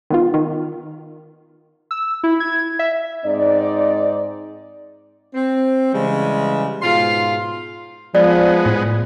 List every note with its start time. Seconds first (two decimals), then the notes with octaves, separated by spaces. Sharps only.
0.10 D#3 B3 F4
0.34 D#3
1.91 E6
2.23 E4
2.40 G#6
2.79 E5
3.25 G#2 C4 D#4 D5
5.34 C4
5.94 C#3 E3 G3 G#3
6.82 G#2 B2 F4 F5 C6
8.15 F3 G#3 B3 D5
8.66 A2